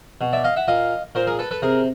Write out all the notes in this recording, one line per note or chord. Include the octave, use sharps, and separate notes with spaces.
B2
D5 E5
D#5 F5
E5 F#5
A#2 D#5 F5
A#2 A#4 C5
G#4 A#4
A4 B4
A4 B4
C3 G#4 A#4